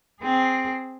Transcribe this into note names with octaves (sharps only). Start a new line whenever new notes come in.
C4 G#4